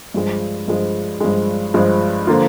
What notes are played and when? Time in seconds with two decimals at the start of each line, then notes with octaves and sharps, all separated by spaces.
0.14 G2 F3 G#3
0.68 G2 F3 G#3
1.21 G2 F3 G#3
1.74 G2 F3 G#3
2.27 D3 F3 A#3 F4